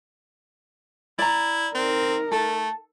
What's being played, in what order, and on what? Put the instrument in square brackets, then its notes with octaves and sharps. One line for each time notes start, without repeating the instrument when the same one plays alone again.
[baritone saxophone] E4 [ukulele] D5 A#5
[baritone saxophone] C4 [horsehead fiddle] D#4 A#4
[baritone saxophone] A3 [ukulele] A4